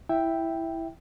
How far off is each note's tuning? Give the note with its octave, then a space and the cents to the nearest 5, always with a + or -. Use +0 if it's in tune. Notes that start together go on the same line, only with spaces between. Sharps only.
E4 +0 E5 +0 G5 +0